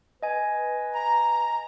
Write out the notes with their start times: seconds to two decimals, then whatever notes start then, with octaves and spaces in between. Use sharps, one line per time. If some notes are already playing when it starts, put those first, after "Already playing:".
0.23 B4 D#5 G#5
0.92 A#5